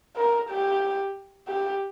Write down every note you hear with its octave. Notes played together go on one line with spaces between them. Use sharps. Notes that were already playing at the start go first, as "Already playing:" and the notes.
A#4
G4
G4